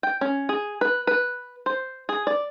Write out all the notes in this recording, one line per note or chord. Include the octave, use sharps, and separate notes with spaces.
G5
C#4
G#4
B4
B4
C5
G#4
D5